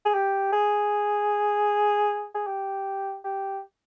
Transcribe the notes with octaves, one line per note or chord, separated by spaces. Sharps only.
G#4
G4
G#4
G#4
G4
G4